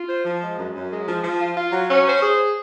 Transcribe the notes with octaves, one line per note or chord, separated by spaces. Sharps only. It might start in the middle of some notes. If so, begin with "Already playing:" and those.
Already playing: F4
C5
F3
G#3
F#2
F#2
G#3
F3
F3
F4
F4
F#3
C#4
C5
G#4